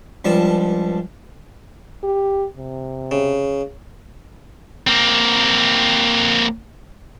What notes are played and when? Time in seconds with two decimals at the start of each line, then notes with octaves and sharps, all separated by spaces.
0.25 C#2 G2 F3 G3 A5
2.03 G4
2.57 C3
3.11 C#3
4.87 A#3 C4